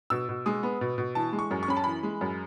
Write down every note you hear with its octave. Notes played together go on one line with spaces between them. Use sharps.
B2 E6
B2
G#3 D#6
B3
B2
B2
E3 A5
G#3
C#6
F#2
C#6
C#4 B5
A5
E3 B5
G#3
F#2